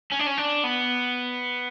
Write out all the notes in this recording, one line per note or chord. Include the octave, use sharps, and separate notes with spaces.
C#4
D4
C#4
D4
B3